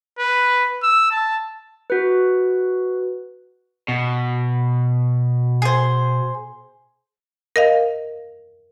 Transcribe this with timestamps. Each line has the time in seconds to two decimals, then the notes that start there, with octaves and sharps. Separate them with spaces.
0.19 B4
0.83 E6
1.11 A5
1.90 F#4 B4
3.88 B2
5.62 G#4 C5
7.56 A#4 D#5 F5